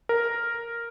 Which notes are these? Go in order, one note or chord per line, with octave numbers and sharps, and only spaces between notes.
A#4